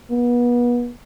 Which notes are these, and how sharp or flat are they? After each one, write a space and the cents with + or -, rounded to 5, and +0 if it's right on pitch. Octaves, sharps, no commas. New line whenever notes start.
B3 -30